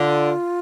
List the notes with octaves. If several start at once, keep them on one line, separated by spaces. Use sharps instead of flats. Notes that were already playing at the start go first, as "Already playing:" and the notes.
Already playing: D3 F4